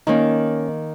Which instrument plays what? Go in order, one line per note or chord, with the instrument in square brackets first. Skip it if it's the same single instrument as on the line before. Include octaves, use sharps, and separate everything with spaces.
[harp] D#3 A#3 [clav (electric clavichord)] C#4 D#4